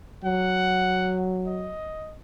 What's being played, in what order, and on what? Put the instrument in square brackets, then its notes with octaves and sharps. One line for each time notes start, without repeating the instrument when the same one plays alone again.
[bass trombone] F#3 [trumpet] F#5
[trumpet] D#5